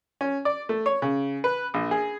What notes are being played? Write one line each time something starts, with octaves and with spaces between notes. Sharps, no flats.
C#4
D5
A3
C#5
C#3
B4
A#1
G#4